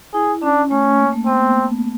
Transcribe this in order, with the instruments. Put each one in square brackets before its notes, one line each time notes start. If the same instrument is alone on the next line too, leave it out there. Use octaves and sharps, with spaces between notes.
[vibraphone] E4 [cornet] G#4
[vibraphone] C#4 [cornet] D4
[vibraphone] A3 [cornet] C#4
[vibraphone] A#3
A3
[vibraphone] B3 [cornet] C4